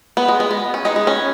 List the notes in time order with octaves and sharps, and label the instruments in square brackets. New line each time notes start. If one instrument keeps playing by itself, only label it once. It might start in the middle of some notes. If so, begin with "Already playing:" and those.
[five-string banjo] B3 [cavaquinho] B4 F#5 D#6
[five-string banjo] G#3
G#3
B3
C#4
[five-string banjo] G#3 [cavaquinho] D#4 G#4 B4 D#5
[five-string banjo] G#3
C#4